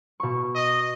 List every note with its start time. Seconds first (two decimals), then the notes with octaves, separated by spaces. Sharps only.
0.20 B2 C#6
0.55 D#5